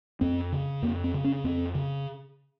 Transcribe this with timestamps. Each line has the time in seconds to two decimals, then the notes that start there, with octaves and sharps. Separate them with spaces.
0.21 F2 C4
0.52 C#3
0.82 F2 A#3
1.04 C4
1.14 C#3
1.24 C#4
1.44 F2 C4
1.75 C#3